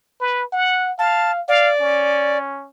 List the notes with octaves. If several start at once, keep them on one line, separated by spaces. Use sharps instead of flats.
B4
F#5
F5 A5
D5 F5
C#4